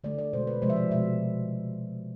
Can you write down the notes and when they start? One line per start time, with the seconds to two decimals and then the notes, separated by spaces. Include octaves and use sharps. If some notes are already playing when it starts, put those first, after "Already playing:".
0.04 D3 A3 D5
0.18 D5
0.33 B2 G#3 C5
0.47 B4
0.62 C3 F3 G#3 C5
0.70 E5
0.76 D5
0.91 B2 G#3 E5